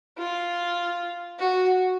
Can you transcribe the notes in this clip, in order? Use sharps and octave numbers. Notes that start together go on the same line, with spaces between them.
F4
F#4